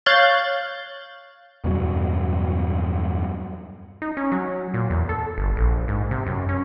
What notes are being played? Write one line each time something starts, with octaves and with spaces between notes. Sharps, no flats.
C#5 F5 F#6 G6 A6
E2 G2 B2 F#3
D#4
C#4
F#3
A#2
E2
A4
G1
A#1
G#2
C3
F#2
C#4